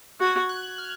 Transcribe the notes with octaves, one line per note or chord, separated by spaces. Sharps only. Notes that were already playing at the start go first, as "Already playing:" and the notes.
F#4 G#6
F#6
F6